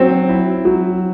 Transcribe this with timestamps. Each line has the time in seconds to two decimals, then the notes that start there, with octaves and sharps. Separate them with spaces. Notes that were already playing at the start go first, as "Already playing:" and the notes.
Already playing: F#3 C4
0.29 E4
0.65 F#3